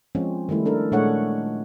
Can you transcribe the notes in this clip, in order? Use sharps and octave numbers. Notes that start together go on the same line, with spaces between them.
F3 G#3 C4 C#4
D#3 G3 A3 E4
D4 A4 A#4
A#2 G#3 A3 D4 C#5 F#5